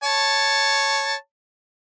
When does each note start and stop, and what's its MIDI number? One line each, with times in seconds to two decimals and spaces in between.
0.03 1.15 73
0.03 1.15 81